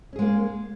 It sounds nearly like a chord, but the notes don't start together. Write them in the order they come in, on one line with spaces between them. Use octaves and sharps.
C#4 G#4 G#3 A#3